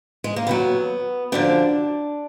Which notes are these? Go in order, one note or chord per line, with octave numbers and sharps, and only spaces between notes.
G#3
A#3
D#2 D#3 F#3 B3
F#2 D3 F3 D4